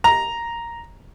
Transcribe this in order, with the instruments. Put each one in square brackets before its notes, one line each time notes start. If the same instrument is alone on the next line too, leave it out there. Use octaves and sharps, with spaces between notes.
[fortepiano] A#5